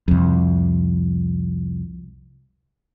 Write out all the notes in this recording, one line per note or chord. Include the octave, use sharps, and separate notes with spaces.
C2 F2